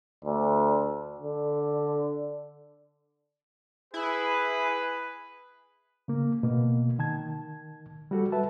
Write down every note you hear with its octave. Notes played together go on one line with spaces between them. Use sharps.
D2
D3
E4 G#4 B4
C#3 A#3
B2 A#3 B3
D#3 A5 G#6
G3 F#4 A4
B4 E5 A5